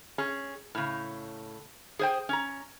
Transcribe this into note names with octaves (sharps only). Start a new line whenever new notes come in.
C#4 G#4
A2 C#3
G#4 C5 G5
C#4 A#5